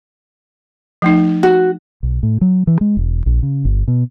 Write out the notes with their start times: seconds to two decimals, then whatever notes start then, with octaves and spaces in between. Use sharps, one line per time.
1.02 F3 A3 D#4
1.43 F#4
2.03 B1
2.23 A2
2.41 F#3
2.67 E3
2.81 G#3
2.97 E1
3.26 A#1
3.43 C#3
3.65 G1
3.88 B2